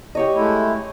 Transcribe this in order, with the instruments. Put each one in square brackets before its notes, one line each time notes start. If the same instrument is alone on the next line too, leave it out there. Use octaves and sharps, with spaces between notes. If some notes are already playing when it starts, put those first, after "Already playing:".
[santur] G4 C#5 D#5
[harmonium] G#3 A3 E4